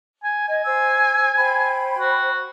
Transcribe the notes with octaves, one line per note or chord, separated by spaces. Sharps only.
G#5
D#5 G#5
C5 E6
C5 G5 B5
F#4